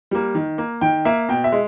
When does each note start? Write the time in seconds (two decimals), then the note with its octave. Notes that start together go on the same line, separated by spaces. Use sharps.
0.11 G3 A#3
0.35 D#3
0.58 A#3
0.81 D#3 G5
1.05 A#3 E5
1.29 B2 G5
1.44 E5
1.52 G#3